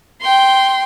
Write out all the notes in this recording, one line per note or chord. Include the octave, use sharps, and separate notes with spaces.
G5 C6